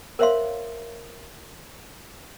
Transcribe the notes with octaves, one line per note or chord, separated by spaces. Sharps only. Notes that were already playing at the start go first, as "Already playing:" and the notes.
A#4 C5 C#5 E5 F5 C6